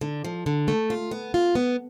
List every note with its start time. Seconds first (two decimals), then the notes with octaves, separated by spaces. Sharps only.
0.01 D3
0.24 F3
0.46 D3
0.68 A3
0.90 F4
1.11 B3
1.34 F4
1.55 B3